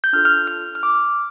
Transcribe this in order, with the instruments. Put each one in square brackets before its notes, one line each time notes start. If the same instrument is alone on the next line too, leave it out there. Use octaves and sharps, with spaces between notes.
[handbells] G6
D4 F4 A4 F6
F6
F6
F6
D6